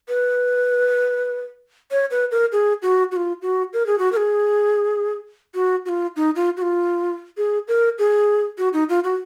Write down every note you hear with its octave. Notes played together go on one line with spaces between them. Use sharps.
B4
C#5
B4
A#4
G#4
F#4
F#4
F4
F#4
A#4
G#4
F#4
A#4
G#4
F#4
F#4
F4
D#4
F4
F#4
F4
G#4
A#4
G#4
F#4
D#4
F4
F#4